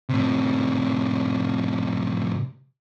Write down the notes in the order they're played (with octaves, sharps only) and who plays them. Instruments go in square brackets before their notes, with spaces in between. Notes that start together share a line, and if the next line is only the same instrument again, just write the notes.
[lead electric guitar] A2 C3